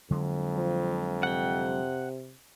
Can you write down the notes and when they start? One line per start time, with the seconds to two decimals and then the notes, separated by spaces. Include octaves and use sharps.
0.11 F2 D3 F#3 G#3
0.56 F3
1.23 C3 F#5 G5